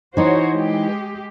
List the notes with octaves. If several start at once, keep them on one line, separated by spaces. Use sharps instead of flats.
E3 D#4 F#4 C5 C#5
G#3 G4